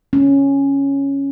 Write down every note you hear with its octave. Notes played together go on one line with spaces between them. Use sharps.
C#4